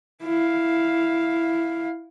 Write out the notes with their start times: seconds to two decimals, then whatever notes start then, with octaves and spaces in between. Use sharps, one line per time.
0.23 E4 F5